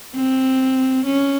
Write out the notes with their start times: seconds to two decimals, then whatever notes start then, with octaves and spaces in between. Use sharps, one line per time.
0.15 C4
1.06 C#4